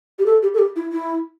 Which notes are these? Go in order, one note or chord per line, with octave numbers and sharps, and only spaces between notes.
G4
A4
G4
A4
G4
E4
E4